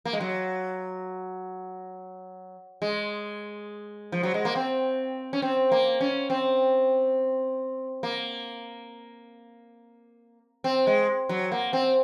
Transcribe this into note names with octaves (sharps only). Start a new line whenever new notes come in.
A#3
G#3
F#3
G#3
F3
F#3
G#3
A#3
C4
C#4
C4
A#3
C#4
C4
A#3
C4
G#3
F#3
A#3
C4